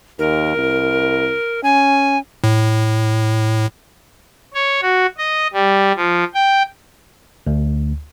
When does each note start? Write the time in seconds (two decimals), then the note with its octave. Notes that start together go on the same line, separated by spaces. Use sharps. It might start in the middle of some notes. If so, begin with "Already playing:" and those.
0.19 D#2 A#4
0.57 C2
1.63 C#4 G#5
2.44 A2
4.54 C#5
4.82 F#4
5.18 D#5
5.53 G3
5.96 F3
6.34 G5
7.47 D2